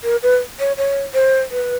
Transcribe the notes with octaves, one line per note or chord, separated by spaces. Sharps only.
A#4
B4
C#5
C#5
C5
B4